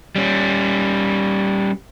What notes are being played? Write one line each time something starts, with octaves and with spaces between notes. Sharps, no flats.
G3 C#4